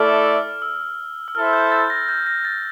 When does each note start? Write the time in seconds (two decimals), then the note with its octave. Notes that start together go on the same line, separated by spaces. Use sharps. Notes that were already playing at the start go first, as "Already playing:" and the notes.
Already playing: A3 E4 A4 D5 F6
0.62 E6
1.28 E6
1.35 E4 A4 C5 E5 F6
1.53 G6
1.72 A6
1.90 A#6
2.08 G6
2.26 A#6
2.45 A6